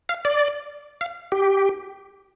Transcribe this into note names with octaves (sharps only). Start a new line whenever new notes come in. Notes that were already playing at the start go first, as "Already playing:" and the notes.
F5
D5
F5
G4